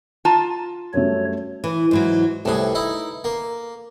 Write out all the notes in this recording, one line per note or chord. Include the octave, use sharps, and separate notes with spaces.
F4 A5 A#5
F#2 G3 A3 C#5
E3
G#2 E3 F#3
C2 A2 G#4 A4 B4
D#4 E4
A#3